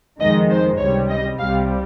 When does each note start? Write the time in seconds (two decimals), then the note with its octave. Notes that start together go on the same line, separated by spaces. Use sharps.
0.20 F2 D#3 G#3 D#5
0.50 C5
0.79 C#2 C3 G3 C#5
1.09 D#5
1.39 C2 C3 G3 F5